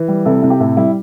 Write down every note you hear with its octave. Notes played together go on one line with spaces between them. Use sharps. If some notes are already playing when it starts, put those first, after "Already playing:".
Already playing: E3
G3
C3 E4 A4
C3 E4
G4
A2 E4 A4
G3 E4